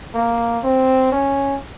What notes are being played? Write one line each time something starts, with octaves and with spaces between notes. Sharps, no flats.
A#3
C4
C#4